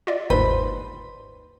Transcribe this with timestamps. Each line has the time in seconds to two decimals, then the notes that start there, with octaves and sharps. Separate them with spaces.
0.07 F4 D5 D#5
0.30 G1 D#2 G#2 B4 C5 B5